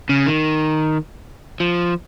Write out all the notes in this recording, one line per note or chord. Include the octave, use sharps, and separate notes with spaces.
C#3
D#3
F3